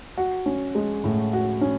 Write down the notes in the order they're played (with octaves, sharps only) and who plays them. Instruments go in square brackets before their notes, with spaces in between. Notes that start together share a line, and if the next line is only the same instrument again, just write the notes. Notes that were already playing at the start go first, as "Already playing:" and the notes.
[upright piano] F#4
C#4
G#3
A2
F#4
C#4